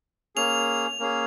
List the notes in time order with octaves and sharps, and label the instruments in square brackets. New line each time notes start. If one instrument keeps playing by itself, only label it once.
[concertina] A#3 C#4 G#4 [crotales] F7
[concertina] A#3 C#4 G#4